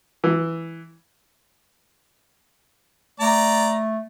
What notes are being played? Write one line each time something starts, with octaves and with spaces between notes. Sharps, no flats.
E3
A3 D5 A#5